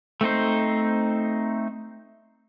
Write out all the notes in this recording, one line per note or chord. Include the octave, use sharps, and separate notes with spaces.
A3 C4 D#4 C5